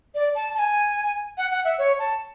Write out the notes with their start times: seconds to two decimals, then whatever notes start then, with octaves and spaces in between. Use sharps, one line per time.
0.15 D5
0.35 A5
0.55 A5
0.59 G#5
1.38 F#5
1.51 F#5
1.65 E5
1.78 C#5
1.99 A5